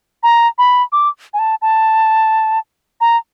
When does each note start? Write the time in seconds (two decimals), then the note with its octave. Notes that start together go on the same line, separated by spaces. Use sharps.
0.23 A#5
0.58 B5
0.92 D6
1.34 G#5
1.39 A5
1.62 A5
3.01 A#5